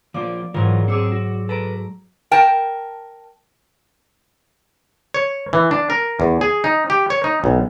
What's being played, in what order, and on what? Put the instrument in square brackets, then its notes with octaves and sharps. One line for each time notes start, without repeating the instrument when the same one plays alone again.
[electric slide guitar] F3 A#3 F4 [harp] D5
[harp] G#2 F#3 [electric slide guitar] E3 F4 A#4
[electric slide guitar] C4 G#4 [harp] D6 E6 C#7
[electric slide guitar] F#4
[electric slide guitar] A4 B4 [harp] A#5 D7
[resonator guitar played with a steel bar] A#4 G5 A5
[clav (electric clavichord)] C#5
E3
D4
A#4
E2
G#4
D#4
G4
C#5
D#4
B1